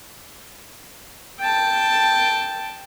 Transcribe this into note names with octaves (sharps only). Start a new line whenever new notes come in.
G5 A5